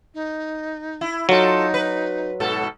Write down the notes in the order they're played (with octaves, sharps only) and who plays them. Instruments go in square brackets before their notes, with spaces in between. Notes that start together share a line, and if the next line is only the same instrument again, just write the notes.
[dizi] D#4
[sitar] E4
[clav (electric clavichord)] F#3 [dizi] D#4 [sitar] F4 A4
[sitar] B4
G#2 B2 A4